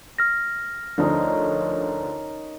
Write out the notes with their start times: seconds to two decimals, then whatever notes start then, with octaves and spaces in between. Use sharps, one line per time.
0.18 F6 A#6
0.98 D2 D3 F3 C#4 D#4 A#4